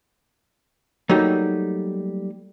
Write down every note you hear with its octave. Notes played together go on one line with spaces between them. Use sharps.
F#3 G3 A3 A#3 D#4